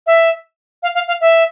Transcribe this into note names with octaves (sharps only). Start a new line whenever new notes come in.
E5
F5
F5
F5
E5